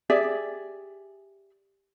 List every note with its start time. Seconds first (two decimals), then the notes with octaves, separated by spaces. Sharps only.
0.10 G4 G#4 D5 E5